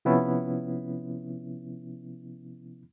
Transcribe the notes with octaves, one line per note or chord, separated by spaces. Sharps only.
C3 F3 B3 C#4 E4